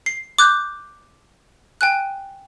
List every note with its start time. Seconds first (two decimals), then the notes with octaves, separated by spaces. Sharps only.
0.06 C7
0.39 D6 F#6 G6
1.81 G5 G#5 F#6